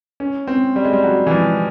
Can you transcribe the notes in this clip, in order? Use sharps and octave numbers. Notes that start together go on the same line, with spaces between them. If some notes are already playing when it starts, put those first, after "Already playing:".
C#4
C4
G3
G#3
G3
F#3
E3
F3